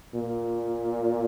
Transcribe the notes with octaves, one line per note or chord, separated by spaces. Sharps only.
A#2